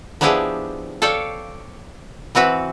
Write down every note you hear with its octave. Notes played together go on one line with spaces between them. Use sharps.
F3 B3 D4 E4 G4 G#4
A4 C#5 D5 F5 G5
E3 C4 F#4 B4